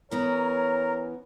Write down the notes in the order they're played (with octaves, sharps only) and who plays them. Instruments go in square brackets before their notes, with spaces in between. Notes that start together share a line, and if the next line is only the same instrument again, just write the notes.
[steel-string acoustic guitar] E3 B3 C#4 [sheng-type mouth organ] A#4 [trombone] C#5 [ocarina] A#5